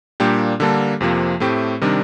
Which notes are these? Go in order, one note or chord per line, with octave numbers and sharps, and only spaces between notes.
A#2 G3 A#3 D4 G4
D3 G3 A#3 D4 A4
F2 C3 F3 A#3
A2 A3 C4 G4
C3 D#3 G3 D4